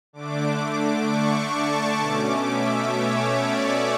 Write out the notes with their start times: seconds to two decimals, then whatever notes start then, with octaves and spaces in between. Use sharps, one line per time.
0.13 D3 A3 D4 D6
1.06 C#6
1.52 A5
1.99 B2 A3 C#4 D6
2.45 E5
2.91 C#5
3.38 D5